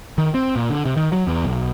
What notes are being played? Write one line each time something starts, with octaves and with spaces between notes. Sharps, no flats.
D#3
C4
A#2
D3
C3
D#3
F#3
E2
B1